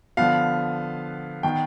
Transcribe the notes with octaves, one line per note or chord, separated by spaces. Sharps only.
D3 F3 B3 F5
D#3 B3 G5